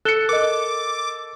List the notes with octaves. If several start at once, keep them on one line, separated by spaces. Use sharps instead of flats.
A4 F#6 C#7 E7 G7
A#4 D#5 D6